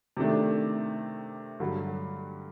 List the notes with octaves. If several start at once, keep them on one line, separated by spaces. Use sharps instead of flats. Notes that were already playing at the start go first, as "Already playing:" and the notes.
C3 D#3 A3 D4
G2 D3 F#3